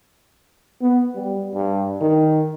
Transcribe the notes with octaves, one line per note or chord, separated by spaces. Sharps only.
B3
G3
G2
D#3